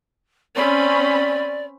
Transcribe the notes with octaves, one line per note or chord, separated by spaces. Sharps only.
C4 C#4 D5 B5